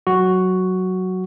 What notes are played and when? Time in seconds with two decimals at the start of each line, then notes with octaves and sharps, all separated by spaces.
0.07 F#3 F#4